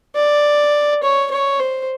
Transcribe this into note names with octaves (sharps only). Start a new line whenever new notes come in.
D5
C#5
C#5
C5